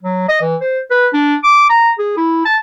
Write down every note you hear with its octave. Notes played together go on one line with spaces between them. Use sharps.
F#3
D#5
E3
C5
B4
D4
D6
A#5
G#4
E4
A5